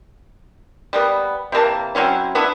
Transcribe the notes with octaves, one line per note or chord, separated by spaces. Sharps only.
G3 A#3 B3
C3 E3 A#3 A5
F#3 C4 C#4 E4
B3 D4 E4